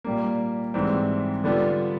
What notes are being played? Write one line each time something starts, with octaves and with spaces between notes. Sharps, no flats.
A#2 G3 A#3
G#2 E3 G3 C4
D3 G3 B3 D4 F4